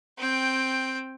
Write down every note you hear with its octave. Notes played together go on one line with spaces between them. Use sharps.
C4 G5